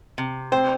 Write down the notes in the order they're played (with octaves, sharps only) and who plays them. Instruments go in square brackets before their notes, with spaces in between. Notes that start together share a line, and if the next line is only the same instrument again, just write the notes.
[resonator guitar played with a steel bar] C3
[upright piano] C4 [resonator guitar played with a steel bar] C5